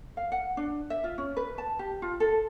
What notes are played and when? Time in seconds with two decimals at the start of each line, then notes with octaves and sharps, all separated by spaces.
0.17 F5
0.32 F#5
0.57 D4
0.90 E5
1.04 F4
1.18 C#4
1.37 B4
1.58 A5
1.79 G4
2.02 F4
2.20 A4